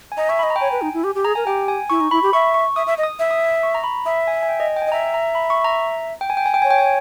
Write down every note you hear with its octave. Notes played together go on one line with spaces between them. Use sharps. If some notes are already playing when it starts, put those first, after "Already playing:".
G#5
D#5 A#5
E5 C#6
B5
D#5
A#5
G5
C#5 G#5
B4
D#4
E4
G4
G4
G#4 A#5
A#4 G#5
G4 G5
G#5
E4 C#6
D#4
E4 B5
G4
E5 C#6
C#6
E5 D#6
E5
D#5
D#6
E5
D#6
C#6
A#5
B5
E5 D#6
G#5
G#5
G5
D#5
G5
G#5
D#5
E5 A#5
A#5
B5
C#6
A#5
G5
G#5
G5
G#5
G5
C#5 G#5
G5
G#5